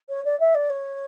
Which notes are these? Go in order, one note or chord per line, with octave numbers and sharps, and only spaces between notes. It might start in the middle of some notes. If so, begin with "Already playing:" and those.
C#5
D5
E5
D5
C#5